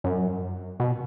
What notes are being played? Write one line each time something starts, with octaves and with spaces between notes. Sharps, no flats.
F#2
B2